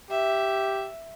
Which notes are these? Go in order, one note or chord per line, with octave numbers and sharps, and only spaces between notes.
G4 E5